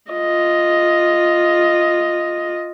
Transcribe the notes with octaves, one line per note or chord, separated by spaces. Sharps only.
F4 D#5